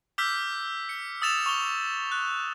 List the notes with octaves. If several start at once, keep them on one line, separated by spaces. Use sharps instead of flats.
D6 E6 F6 G6 B6
C#7
D#6 E6 A6 E7 F7
C#6 F7 G7
F#6